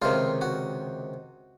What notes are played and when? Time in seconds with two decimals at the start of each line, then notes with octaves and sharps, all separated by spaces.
0.02 C#2 C3 D#3 F4
0.41 F#4